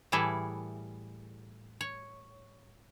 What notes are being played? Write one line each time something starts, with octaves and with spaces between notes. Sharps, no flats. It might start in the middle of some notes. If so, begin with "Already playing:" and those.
A2 E3 G3 E4 G#4 A4
C#5